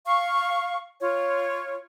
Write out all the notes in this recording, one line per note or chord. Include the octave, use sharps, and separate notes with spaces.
F5 C#6
F4 C#5